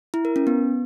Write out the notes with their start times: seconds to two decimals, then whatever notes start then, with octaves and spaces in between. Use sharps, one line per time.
0.14 E4
0.25 A#4
0.36 C#4
0.47 B3